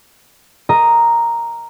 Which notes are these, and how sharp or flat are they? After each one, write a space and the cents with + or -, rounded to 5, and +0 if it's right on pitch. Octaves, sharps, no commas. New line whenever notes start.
A#4 +0 D#5 +0 A#5 +0